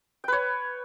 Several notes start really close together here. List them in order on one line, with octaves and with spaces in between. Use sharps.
G5 B4 C#5